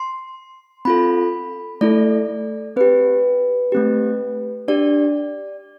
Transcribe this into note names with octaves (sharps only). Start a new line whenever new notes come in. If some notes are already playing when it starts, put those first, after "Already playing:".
Already playing: C6
C4 F4 A4 B5
A3 E4 A4 D5
C4 G4 B4
A3 C4 G4
D4 G4 D5